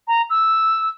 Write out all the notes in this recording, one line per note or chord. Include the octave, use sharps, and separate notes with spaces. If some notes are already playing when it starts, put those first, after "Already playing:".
A#5
E6